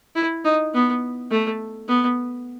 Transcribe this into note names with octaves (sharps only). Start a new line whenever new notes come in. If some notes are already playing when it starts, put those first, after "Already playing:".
E4
D#4
B3
A3
B3